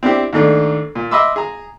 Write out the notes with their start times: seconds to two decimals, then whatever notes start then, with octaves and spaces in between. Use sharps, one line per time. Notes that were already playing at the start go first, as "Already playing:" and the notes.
0.03 C4 D4 E4 G4
0.33 D#2 G#2 A3 D4
0.95 A#2
1.11 D#5 E5 B5 C6 D6 E6
1.36 G#4 A#5